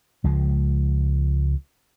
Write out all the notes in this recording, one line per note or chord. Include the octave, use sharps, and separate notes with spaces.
C#2 F3 G#3